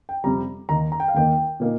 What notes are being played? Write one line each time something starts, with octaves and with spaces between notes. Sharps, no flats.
G5
F2 C3 G3 A#5
D#2 D#3 A#3 D#4 A#5
A#5
G5
F5
D#2 D#3 A#3 D#4 G5
A#2 A#3 D#4